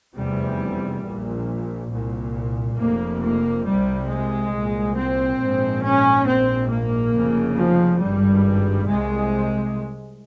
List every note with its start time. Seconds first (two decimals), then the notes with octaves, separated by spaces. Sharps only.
0.15 F1 E2 C3 G3
1.02 A#1 A#2
1.90 C2 A#2
2.77 F1 F2 C3 A#3
3.21 A#3
3.64 C2 C3 G3
4.08 G#3
4.52 C2 A#2
4.96 C4
5.39 A#1 G#2
5.83 C#4
6.26 A#1 G#2 C4
6.70 A#3
7.14 F1 F2 C#3
7.56 F3
8.00 G#1 G2 G3
8.88 C2 C3 G#3